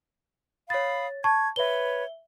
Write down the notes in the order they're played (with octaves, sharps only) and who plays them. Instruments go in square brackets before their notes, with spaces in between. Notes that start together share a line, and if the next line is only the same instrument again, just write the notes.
[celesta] C#5 A6 [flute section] F5 B5 D#6
[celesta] A5 C#6 [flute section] G#6
[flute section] B4 C#5 [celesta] E5 G7